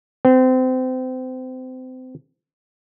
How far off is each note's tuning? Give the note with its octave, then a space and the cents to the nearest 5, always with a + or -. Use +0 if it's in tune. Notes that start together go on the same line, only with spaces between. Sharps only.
C4 -30